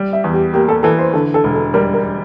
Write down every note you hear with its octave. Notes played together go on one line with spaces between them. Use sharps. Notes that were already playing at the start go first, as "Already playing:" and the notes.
Already playing: G3
E5
E2
G4
A#3 G4
A4
E3 A4
C5
D3 A4
A4
E1
A4
G3 A#4
A#4